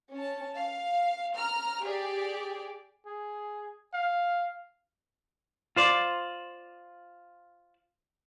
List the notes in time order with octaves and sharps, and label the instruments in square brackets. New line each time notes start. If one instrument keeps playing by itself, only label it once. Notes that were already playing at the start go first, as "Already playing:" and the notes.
[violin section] C#4 A5
F5
A#5 F6
G4 G#4 D5
[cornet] G#4
F5
[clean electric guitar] F4 C5 D5